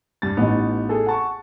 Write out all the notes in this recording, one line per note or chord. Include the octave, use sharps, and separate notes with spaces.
G2 A6
A1 B3 D#4
G#4 A4
F#5 A5 C#6